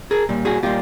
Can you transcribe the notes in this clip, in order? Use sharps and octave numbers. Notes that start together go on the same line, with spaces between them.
G#4 A#4
A#2 G3
F#4 G#4
A#2 G3 F4 G4